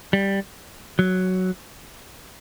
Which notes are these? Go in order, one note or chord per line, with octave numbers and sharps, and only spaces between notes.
G3
F#3